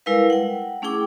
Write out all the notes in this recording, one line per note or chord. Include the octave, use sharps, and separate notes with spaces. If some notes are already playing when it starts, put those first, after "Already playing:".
G3 G#3 E4 A#4 B4 F5
F#5 G5
A3 C#4 E4 G#4 G5 D6